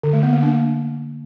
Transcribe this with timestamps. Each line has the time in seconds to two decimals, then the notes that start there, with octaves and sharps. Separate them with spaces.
0.03 D3
0.13 A3
0.23 B3
0.33 A#3
0.43 D4